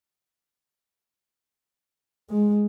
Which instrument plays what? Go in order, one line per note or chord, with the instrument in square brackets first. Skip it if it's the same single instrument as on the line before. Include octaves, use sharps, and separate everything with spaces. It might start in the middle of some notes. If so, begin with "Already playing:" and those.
[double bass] G#3